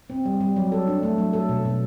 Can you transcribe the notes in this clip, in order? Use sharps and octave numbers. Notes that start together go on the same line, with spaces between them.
C4
G3
G3
F#3
A4
D4
A3
F#3
A4
B2
B2